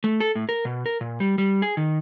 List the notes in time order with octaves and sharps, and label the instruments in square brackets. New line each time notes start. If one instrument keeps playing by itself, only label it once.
[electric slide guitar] A3
A4
A2
A#4
B2
A#4
A#2
G3
G3
G#4
D#3